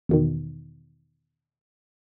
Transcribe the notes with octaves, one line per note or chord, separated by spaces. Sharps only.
E2 B2 D#3